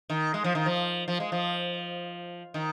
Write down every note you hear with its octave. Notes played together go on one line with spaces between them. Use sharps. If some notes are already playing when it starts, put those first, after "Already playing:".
D#3
G#3
F3
D#3
F3
F3
G#3
F3
D#3